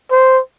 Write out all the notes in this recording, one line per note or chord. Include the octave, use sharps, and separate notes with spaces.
C5